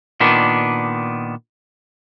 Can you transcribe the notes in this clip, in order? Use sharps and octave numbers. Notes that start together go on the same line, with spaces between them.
A#2 D#3 B3 D4